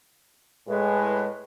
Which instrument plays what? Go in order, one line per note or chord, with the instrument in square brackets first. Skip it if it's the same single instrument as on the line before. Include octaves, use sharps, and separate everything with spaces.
[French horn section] A2 G#3 [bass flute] B4